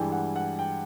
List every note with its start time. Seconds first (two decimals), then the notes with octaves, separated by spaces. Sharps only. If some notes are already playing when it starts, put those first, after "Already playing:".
Already playing: G2 E3 G#3 G5
0.12 F#5
0.36 F#5
0.59 G5